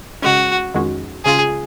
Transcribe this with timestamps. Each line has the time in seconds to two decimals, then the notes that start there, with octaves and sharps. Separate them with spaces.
0.22 C#3 G#3 C#4 F#4
0.74 F2 D#3 G#3 C#4 F#4
1.25 C#3 G#3 C#4 F4 G#4